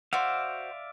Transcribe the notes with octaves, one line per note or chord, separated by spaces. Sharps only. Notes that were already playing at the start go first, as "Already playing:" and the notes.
F#4 C5 D5 E5 F5